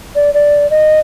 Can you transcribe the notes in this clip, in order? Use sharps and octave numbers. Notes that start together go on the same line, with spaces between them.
D5
D5
D#5